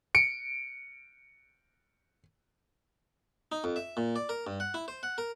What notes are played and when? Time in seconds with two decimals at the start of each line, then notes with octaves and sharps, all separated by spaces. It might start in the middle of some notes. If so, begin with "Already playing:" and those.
0.15 C#7 D7
3.52 D#4
3.64 F2
3.76 E5
3.97 A#2
4.16 D5
4.29 A#4
4.47 G2
4.60 F#5
4.74 E4
4.88 C5
5.03 F#5
5.18 A#4